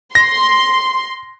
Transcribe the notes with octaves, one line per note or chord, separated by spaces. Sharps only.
C6 A#6